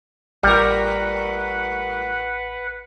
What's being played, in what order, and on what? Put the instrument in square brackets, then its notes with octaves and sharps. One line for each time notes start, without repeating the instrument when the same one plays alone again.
[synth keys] A1 [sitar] A2 A#4 [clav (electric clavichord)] G3 [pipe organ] B4 F#5